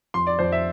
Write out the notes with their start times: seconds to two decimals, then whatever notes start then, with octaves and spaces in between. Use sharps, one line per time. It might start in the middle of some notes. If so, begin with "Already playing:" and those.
0.14 F2 C6
0.27 D5
0.39 F2 C5
0.52 E5